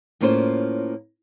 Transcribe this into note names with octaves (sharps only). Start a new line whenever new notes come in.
A2 A#3 C#4 F4 A4 C5